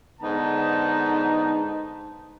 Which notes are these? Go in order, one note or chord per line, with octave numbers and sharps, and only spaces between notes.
G#2 D3 B3 D#4 A5 A#5